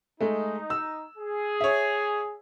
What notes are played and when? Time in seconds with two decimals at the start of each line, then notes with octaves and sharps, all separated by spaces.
0.20 G#3 A3 D#4
0.70 E6
1.18 G#4
1.61 C#5 E5